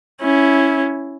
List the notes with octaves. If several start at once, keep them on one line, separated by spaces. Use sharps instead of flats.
C#4 E4